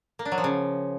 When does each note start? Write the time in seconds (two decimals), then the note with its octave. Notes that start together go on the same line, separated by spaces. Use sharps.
0.19 A#3
0.25 D4
0.32 F#3
0.38 F3
0.44 C#3